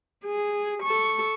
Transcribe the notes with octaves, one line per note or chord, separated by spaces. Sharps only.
G#4
A4 C#6